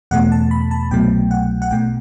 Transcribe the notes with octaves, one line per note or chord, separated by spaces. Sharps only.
E2 B2 A3 F#5
A5
B5
A5
C2 B2 F#3 A3 G5
F#5
F#5
B1 B2 A3 G5